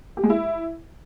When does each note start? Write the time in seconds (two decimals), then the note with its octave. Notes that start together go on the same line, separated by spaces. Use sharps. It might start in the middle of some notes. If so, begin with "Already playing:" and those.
0.17 G4
0.23 G#3
0.30 E4